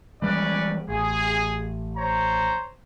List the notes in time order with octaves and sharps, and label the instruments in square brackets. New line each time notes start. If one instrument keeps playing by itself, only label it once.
[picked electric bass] E3 G3 G#3 [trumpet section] C#4 B4 D5
[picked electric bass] A1 [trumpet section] G#4
[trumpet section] C5 C#5 A#5